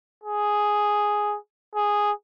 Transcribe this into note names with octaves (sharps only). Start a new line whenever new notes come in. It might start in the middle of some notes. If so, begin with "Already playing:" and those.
G#4
G#4